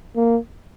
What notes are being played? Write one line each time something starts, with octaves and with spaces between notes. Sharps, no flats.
A#3